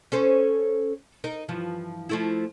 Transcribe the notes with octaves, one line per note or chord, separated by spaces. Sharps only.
C#4 A4 C5
D#4 A#4
G2 E3 F3
F3 A3 E4